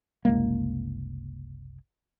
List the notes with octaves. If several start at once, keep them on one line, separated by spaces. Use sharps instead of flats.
F#1 C2 G#3 A#3